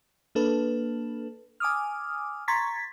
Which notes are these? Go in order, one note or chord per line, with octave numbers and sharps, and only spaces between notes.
A#3 D4 A4 B4
G#5 D6 D#6 F6
A#5 C6 C#6 G#6 A6 B6